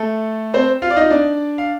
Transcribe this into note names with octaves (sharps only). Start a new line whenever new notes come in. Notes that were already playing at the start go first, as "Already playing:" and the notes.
Already playing: A3 A4
C4 C5
F4 F5
D5
D#4 D#5
D4 D5
F5